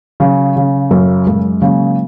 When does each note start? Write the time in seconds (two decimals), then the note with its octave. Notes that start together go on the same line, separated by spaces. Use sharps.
0.20 C#3 F#3
0.56 C#3
0.91 F#2 F#3
1.27 F#2 G#3
1.62 C#3 F#3 A#3